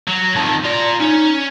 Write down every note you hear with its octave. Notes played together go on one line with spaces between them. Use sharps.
F#3
F2 D#3 A5
F4 D5 A#5
C#4 D#4 C#5